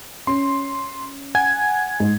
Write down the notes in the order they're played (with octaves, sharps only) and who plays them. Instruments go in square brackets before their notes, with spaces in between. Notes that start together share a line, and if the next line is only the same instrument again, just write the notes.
[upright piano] C#4 [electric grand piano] C6
[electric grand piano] F#5 G#5 G#6
[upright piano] G#2